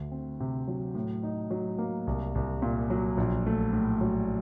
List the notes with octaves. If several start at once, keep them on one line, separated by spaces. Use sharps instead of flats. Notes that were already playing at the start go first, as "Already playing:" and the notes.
Already playing: D2
C4
C3
F#3
A2
D#4
F#3
A#3
C2
C2
A#2
F#3
A#1
A3
A2
F#3